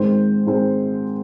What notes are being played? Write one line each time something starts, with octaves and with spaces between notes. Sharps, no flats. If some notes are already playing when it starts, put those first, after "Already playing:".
Already playing: G#2 D#3 G#3 C4 C5
G#2 D#3 G#3 C4